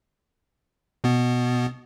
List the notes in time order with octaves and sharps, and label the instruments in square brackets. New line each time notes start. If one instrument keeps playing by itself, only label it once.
[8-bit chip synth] B2 B3